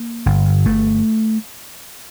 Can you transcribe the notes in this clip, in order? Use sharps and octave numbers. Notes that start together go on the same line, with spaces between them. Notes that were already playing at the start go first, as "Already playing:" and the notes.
Already playing: A#3
G1
G1 A3